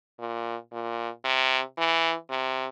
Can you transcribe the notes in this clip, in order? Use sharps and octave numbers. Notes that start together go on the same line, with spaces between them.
A#2
A#2
C3
E3
C3